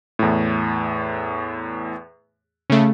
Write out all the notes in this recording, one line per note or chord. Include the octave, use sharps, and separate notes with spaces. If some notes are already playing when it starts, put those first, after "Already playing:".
E2 A2
C#3 A3